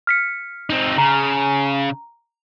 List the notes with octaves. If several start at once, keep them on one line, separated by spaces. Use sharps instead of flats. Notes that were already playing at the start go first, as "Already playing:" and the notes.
F6 B6 C#7
C4 D#4
C#3 A#5